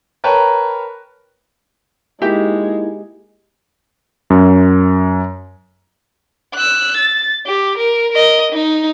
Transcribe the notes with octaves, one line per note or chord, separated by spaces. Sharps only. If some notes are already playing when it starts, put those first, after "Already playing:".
A#4 B4 C#5 G5 A5 A#5
G#3 A#3 D#4 E4 F#4 G4 E5
F#2
E6 F#6
A6
G4
A#4
A#4 D#5
D#4